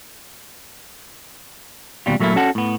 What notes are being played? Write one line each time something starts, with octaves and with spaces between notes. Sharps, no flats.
D#2 B2 G3 F4
A#2 F#3 A3 A#3 E4
C#4 F#4 A4 F#5
A2 B3